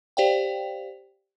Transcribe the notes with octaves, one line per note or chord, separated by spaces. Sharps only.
G4 C5 D5 F5 G5